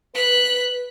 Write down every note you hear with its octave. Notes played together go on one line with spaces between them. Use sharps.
B4 F#6 B6